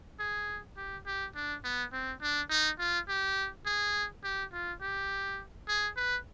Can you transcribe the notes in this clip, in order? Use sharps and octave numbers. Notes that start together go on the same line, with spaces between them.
G#4
G4
G4
D4
B3
C4
D4
D#4
F4
G4
G#4
G4
F4
G4
G#4
B4